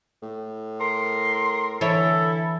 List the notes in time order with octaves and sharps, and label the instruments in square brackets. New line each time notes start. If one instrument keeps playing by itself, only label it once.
[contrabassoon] A2
[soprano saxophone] A#4 [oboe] C6
[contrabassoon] D3 [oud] E3 C#5 [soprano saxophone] E4 [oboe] A4